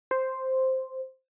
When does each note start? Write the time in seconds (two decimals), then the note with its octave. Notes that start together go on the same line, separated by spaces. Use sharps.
0.11 C5